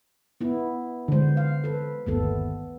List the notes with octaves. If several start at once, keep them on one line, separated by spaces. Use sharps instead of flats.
B3 E4
D3 E3 G#3 C5
F5
A4 B4
G1 D#2 A3 B3 A4